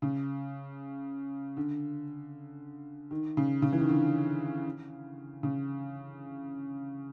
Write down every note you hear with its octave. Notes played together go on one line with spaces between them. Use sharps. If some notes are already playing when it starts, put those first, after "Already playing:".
C#3
D3
D#3
C#3
C#3
E3
D#3
D3
C#3